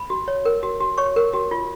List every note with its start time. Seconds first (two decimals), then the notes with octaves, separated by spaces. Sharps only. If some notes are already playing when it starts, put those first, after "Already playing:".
Already playing: B5
0.10 F#4
0.28 C#5
0.45 A#4
0.63 F#4
0.80 F#4
0.98 C#5 C#6
1.16 A#4
1.33 F#4
1.51 F4